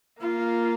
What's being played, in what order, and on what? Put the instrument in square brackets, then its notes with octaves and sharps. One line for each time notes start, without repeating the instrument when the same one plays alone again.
[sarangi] A#3 [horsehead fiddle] F4